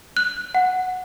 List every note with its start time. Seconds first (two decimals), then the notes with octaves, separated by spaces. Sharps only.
0.17 F#6
0.55 F#5